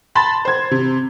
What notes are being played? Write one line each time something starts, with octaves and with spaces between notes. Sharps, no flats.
A5 B5 C6 A6
C5 G#6
C3